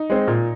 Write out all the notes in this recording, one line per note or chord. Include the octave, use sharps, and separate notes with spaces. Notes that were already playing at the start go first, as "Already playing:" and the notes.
Already playing: D#4
G#3 C4
A#2